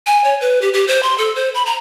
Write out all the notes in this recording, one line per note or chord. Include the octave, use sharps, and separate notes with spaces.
G#5
C#5
B4
G4
G4
C5
C6
A4
C5
B5
A#5